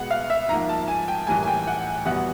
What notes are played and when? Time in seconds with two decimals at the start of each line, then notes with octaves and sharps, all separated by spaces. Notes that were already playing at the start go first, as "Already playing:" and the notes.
Already playing: B2 G#3 B3 F#5
0.11 F5
0.30 E5
0.49 G#2 F3 A#3 A#5
0.69 A5
0.88 G#5
1.08 G5
1.27 A2 E3 G3 A#3 G#5
1.43 G#5
1.47 G5
1.67 F#5
2.05 E2 B2 G3 B3 F#5